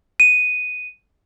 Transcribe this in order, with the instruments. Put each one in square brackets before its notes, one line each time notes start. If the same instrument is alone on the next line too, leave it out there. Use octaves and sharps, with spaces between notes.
[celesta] D#7